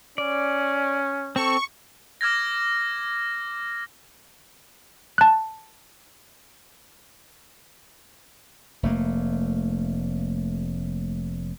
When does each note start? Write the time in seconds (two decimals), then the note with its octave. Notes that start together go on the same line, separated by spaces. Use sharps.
0.18 C#4 D5
1.36 C4 A4 C#6
2.21 D6 F6 G#6 A#6
5.18 A5 F#6
8.83 F1 A3 A#3